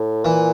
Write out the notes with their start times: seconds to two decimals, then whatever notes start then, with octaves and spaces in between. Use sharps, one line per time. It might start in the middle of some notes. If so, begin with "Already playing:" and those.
Already playing: A2
0.25 A#2 E3